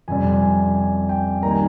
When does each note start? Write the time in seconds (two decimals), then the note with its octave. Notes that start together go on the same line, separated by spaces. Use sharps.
0.08 F2 C3 G3 G#5
0.42 G#5
0.76 G#5
1.09 G5
1.43 D#3 G3 A#3 A#5
1.51 G#5